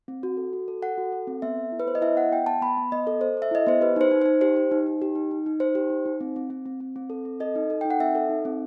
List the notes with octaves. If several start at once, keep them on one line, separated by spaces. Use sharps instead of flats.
C4
F#4
A4
F#4
A4
A4 F#5
F#4
A4
C4
B3 E5
A4
E4
B4
B3 C5
D#5
E4 E5
B3 F#5
B3 G5
B3 A5
B3 B5
B3
B3 D#5
A4
A4 C5
A4 E5
E4 D#5
B3 C5
G4 B4
D#4 C5
D#4
C5
D#4
G4 C5
G4
D#4
D#4
G4
D#4
D#4
D#4
D#4 C5
G4
D#4
D#4
C4
C4
C4
C4
C4
C4
A4
C4
A4 D#5
D#4
A4
D#4 G5
F#5
C4 E5
A4
D#4
C4